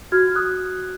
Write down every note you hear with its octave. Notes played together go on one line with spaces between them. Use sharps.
F#4 F6 G#6
D#6 F#6